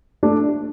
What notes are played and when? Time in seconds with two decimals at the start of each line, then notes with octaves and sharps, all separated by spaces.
0.23 A3 D4